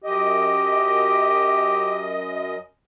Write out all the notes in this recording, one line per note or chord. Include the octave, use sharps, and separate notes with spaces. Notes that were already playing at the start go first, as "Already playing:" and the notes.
F#2 G4 D#5